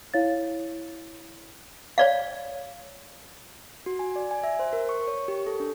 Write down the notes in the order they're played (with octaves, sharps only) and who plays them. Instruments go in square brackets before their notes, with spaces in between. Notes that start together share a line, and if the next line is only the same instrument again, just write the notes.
[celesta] E4 C#5 F5 A6
[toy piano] C#5 D5 F5
[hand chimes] F#4
G#5
D5
G#5
E5
C5
A#4
C#6
C#5
G4
A4
D4